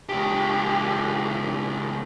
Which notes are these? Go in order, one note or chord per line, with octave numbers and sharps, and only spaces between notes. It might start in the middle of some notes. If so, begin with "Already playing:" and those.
C#2 G4